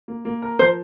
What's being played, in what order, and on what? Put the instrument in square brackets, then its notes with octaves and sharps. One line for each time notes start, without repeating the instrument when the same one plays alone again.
[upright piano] A#3
A#3
A#4
[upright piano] F3 [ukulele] C5